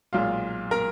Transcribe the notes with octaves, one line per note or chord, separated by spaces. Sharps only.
B1 A#2 G#3 F4 F5
A#4 A#5